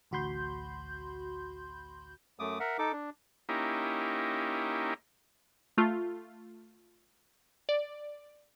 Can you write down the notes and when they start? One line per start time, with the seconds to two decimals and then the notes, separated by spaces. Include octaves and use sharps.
0.11 A1 D2 F#4 B5 C6 G6
2.39 F#2 A3 D6 D#6
2.60 A#4 E5 F#5
2.79 D#4 A4 D6
2.93 D4
3.49 A#3 C#4 D#4 E4 G4
5.78 A3 F4
7.69 D5